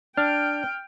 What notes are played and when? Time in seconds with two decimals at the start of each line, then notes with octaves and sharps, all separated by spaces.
0.17 D4 G5 F6